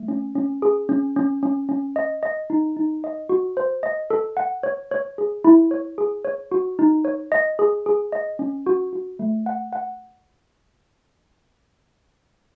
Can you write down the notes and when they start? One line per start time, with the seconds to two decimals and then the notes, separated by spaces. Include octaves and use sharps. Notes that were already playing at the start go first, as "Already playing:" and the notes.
Already playing: A3
0.08 C#4
0.35 C#4
0.62 G#4
0.89 C#4
1.16 C#4
1.43 C#4
1.69 C#4
1.96 D#5
2.23 D#5
2.50 D#4
2.76 D#4
3.04 D#5
3.29 F#4
3.57 C5
3.83 D#5
4.10 A4
4.37 F#5
4.63 C#5
4.91 C#5
5.18 G#4
5.45 E4
5.71 C#5
5.98 G#4
6.25 C#5
6.51 F#4
6.79 D#4
7.05 C#5
7.32 D#5
7.59 G#4
7.86 G#4
8.12 D#5
8.39 C#4
8.66 F#4
8.93 F#4
9.19 A3
9.46 F#5
9.73 F#5